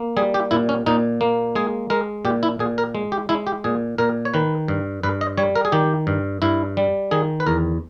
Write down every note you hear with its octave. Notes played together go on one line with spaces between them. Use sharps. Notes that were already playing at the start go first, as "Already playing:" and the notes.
Already playing: A#3
G3 G#4
G4
A#2 E4
C#4
A#2 D#4
A#3
G#3 G#4
G#3 A#4
A#2 G4
E4
A#2 G#4
A#4
G#3
G4
G#3 E4
G4
A#2 G#4
A#2 A#4
C#5
D#3 B4
G2
G2 B4
D#5
G3 C#5
A#4
G#4
D#3 G4
G2
G2 E4
G3
D#3 G#4
B4
E2 A#4